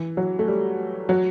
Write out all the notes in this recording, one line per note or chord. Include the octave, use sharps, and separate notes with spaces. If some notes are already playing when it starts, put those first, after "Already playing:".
Already playing: E3
F#3
A3
G3
F#3